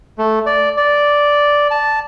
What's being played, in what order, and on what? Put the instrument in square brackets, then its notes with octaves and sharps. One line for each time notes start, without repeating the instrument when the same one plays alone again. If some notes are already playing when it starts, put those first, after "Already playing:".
[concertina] A3
D5
D5
A5